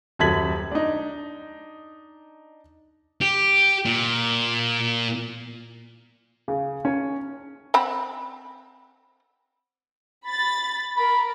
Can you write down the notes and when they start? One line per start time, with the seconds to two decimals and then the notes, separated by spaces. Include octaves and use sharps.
0.19 D#1 F#2 A4 G#6 B6 F#7
0.72 D4 D#4
3.21 G4
3.85 A#2
6.48 C#3
6.85 C#4
7.74 C4 F#5 B5
10.27 B5 A6
10.97 A#4 B5